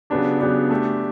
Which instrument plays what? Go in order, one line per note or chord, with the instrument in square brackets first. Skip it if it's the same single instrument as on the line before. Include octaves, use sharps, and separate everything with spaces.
[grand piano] C#3 F#3 B3 D4 G4
C#3 F#3 B3 D4 G4
A3 D4 G4